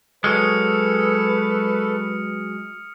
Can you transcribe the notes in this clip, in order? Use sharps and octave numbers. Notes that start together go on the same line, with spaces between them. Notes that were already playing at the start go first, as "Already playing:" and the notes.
F#3 G#3 A4 B4 D#6 F6 C#7